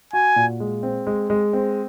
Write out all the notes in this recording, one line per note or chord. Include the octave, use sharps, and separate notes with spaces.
F#4 G#5
A#2
G#3
C4
G#3
G#3
C4